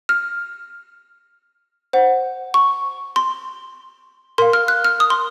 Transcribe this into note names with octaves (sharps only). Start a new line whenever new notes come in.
F6
C5 F#5
C#6
C6
A#4 F5 C6
F6
F#6
F6
D#6
C6